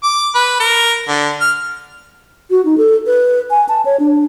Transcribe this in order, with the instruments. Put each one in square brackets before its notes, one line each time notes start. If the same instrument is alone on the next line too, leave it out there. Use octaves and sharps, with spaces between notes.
[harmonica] D6
B4
A#4
D3
F6
[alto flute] F#4
D#4
A4
B4
G#5
A5
C#5
D4